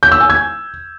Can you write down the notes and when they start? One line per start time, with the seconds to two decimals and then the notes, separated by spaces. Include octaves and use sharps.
0.03 G6
0.12 E6
0.21 G#5
0.29 G#6